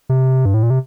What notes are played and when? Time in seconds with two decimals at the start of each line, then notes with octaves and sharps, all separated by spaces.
0.09 C3
0.45 G2
0.54 A2
0.63 A#2
0.70 C3